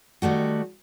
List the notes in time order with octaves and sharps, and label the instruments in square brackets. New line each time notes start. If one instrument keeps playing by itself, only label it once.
[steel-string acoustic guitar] D#3 G3 A3 F#4